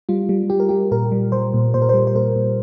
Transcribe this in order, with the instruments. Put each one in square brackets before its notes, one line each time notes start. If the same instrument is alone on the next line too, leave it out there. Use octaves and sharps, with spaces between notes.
[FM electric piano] G3 F4
G3
G3 G4
A#4
G3 G4
A#2 A#4
G3
G3 C5
A#2
A#2 C5
A#4
G3 C5
C5
A#2 A#4
A#2